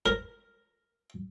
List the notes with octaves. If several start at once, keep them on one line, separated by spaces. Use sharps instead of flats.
A#4